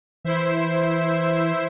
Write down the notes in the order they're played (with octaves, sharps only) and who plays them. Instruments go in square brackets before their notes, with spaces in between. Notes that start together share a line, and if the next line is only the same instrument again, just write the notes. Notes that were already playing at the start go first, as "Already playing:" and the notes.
[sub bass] E3 [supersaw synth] E4 C5 E5